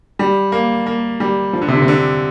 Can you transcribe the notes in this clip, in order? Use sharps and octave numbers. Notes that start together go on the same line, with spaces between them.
G3
A#3
A#3
G3
F3
D3
C3
D3
C3
D3